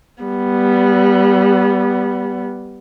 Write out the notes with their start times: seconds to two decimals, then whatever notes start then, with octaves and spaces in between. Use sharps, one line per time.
0.23 G3 B3